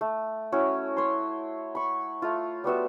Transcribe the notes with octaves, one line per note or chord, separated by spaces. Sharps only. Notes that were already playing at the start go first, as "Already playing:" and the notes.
A3
C#4 E4 F#4
C#5 C6
B5 C#6
A3 F4
G3 B3 F#4 E5